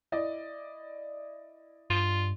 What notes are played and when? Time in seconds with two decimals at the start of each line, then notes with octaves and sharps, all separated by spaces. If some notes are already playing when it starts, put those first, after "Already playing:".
0.12 E4 D5 D#5
1.90 G2 F4